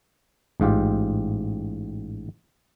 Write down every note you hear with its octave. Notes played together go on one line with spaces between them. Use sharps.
A1 G#2 F4 G4